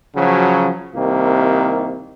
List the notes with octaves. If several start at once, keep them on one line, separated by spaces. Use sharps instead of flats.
C#3 F3 F#3
C2 C3 D#3 A#3